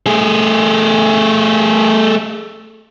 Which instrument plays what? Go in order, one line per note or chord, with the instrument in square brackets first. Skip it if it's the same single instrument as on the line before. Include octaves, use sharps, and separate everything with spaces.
[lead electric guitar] A3 G#4